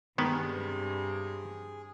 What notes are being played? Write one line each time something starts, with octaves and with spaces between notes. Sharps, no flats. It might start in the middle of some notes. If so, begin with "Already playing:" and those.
G2 C3 D#3 G#3 B3 G#4